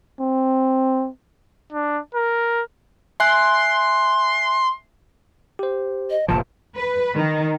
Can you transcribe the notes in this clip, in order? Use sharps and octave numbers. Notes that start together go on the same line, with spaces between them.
C4
D4
A#4
E5 G#5 C6 F#6
G4 C5
D#5
F1 A#2 F3 A5
B4
D#3